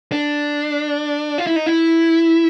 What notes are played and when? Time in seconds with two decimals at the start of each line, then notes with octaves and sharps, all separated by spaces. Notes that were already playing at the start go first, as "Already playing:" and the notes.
0.12 D4
1.38 F4
1.47 E4
1.56 D#4
1.66 E4